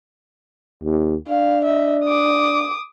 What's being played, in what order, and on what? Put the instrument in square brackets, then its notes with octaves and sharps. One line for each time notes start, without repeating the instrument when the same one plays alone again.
[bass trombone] D#2
[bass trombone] D4 [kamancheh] F5
[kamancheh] D#5 E5
D6 D#6